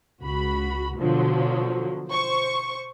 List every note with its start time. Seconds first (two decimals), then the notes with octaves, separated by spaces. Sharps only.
0.21 C#2 F#4 B5
1.00 B2 D3 F3 F#3
2.09 C5 C#6